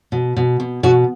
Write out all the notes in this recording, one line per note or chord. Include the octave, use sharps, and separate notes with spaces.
B2
B2
B2
B2 F#4